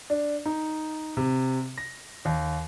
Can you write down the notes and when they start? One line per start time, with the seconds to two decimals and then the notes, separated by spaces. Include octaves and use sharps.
0.10 D4
0.46 D#4
1.17 C3
1.78 A#6
2.25 D#2